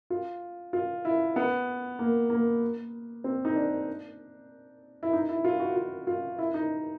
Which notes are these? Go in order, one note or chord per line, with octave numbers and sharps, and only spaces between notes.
F4
F4
E4
B3
A#3
A#3
C4
D#4
D4
E4
D#4
E4
F4
F#4
F4
F4
E4
D#4